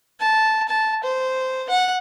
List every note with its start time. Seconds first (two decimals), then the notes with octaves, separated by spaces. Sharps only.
0.20 A5
0.68 A5
1.04 C5
1.70 F#5